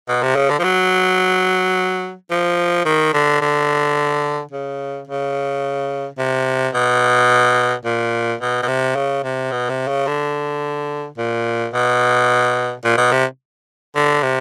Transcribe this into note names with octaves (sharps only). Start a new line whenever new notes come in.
B2
C3
C#3
D3
F3
F#3
F3
D#3
D3
D3
C#3
C#3
C3
B2
A#2
B2
B2
C3
C#3
C3
B2
C3
C#3
D3
A#2
B2
A#2
B2
C3
D3
C3